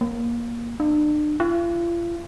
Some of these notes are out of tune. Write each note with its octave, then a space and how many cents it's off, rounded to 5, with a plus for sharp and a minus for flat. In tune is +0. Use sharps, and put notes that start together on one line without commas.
A#3 +15
D4 +40
F4 -40